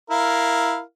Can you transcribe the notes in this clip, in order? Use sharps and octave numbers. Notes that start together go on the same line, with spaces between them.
E4 A#4 F5